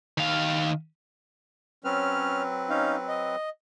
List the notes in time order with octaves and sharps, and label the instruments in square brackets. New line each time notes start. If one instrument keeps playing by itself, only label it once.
[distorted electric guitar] D#3 F5
[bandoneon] F#3 C4 B4 [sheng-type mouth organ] C#4 F6
[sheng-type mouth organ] C#4 D#4 F5
D#5